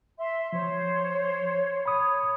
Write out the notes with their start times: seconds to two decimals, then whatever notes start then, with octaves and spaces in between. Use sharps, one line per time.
0.18 E5 C6
0.53 F3 C5 C#5
1.86 C#5 B5 D#6